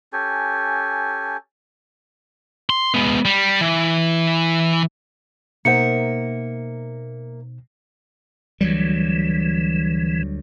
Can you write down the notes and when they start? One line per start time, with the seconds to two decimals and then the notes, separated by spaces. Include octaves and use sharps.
0.13 C#4 G4 A4 G#5
2.70 C6
2.94 G#3 B3
3.25 G3
3.61 E3
5.65 B2 A#3 D#4 A#4 C5 E5 F#5 C#7
8.61 D2 E3 F#3 G3